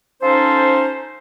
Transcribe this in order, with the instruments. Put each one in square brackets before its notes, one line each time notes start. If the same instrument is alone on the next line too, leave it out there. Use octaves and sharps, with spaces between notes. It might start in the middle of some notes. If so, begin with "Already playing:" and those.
[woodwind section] F3 C#4 D#4 A4 C5